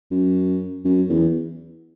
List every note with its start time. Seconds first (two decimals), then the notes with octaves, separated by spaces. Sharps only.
0.11 F#2
0.85 F#2
1.10 E2